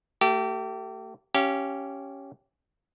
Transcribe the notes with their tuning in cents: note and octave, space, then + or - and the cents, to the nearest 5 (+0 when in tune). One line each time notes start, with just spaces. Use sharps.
A3 +30 G4 -30
C#4 +0 G4 -15 F5 -30